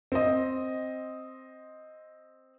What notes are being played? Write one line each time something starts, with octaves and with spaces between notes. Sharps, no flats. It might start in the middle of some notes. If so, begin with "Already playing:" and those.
C4 D#5